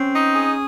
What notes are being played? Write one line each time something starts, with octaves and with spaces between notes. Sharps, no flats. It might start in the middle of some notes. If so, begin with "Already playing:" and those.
Already playing: C4 C#4
D#4
G#4